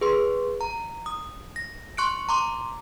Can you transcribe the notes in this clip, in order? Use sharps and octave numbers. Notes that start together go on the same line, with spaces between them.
G#4 B4 C6
A#5
D#6
A#6
C6 C#6 F#6 C#7 D7
A#5 C6 D6